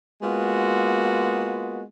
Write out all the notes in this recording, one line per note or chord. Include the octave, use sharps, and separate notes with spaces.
G#3 A#3 B3 F4 F#4